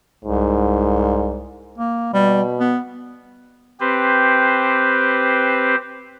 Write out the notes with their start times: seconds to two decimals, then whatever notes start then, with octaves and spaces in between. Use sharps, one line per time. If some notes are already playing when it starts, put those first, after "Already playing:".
0.25 C2 G#2
1.78 A#3
2.14 B2 G3
2.60 B3
3.80 C4 G4 B4 C5